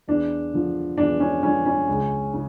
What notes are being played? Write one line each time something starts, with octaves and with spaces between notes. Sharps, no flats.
E2 D4
D3 F3
E2 D4
C#4
D3 F3 C#4
C#4
C#2
C#3